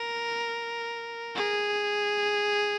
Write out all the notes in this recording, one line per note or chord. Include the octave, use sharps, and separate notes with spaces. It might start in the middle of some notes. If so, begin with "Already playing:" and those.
Already playing: A#4
G#4